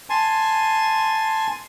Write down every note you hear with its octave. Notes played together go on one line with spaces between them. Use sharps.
G#5 A5 C6